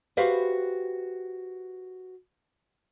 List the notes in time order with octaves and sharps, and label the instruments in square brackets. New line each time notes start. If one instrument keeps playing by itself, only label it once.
[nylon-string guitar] F#4 G4 B4 C5 E5 F5